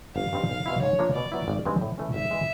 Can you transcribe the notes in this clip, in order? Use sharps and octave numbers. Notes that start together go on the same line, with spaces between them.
G1 F5
G2 D#3 G3 C4
B1
B2 G3 C4 E4
G#2 C#5
F3 A#3 D4
B2 D5
F#3 B3 E4
G#1
G2 D#3 G#3 C4
A2
E3 A3 C#4
G#1 E5
E3 G#3